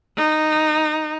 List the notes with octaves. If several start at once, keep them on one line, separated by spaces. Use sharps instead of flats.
D#4